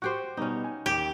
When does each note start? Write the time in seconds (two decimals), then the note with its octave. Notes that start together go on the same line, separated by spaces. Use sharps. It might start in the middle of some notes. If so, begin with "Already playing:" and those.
0.02 F#4 G4 C5 C#6
0.37 B2 G3 B3 C#4 D#4
0.64 G#5
0.86 D#2 G4 G5